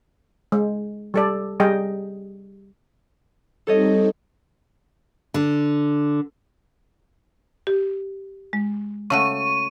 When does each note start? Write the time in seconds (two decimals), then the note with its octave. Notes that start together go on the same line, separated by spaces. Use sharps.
0.52 G#3
1.14 G3 A4 D5
1.60 G3 G#4 D#5 G5
3.67 G3 C4 D#4 A4 C#5 D#5
5.34 D3
7.67 G4
8.53 G#3
9.10 C#3 A3 F#4 C#6 D#7